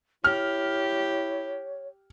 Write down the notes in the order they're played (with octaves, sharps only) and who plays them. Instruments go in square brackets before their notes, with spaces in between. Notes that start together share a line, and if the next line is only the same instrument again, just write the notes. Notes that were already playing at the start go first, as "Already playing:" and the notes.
[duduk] E4 [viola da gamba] G4 [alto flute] C#5 [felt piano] F6